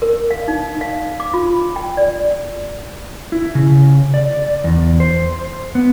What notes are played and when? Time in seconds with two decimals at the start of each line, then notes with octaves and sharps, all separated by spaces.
0.02 A#4
0.31 F5
0.48 D#4
0.81 F5
1.20 D6
1.34 F4
1.76 G5
1.97 D5
3.32 E4
3.55 C#3
4.14 D5
4.64 E2
5.00 C5
5.75 B3